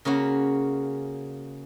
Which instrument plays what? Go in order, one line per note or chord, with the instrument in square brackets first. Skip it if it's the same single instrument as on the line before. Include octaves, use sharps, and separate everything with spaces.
[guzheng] C#3 A#3 C#4 F#4